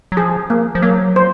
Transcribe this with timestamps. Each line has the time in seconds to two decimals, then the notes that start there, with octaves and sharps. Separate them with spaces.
0.12 F#3
0.17 F3 G#4
0.50 A#3
0.75 F3
0.82 F#3 A#3
1.16 C5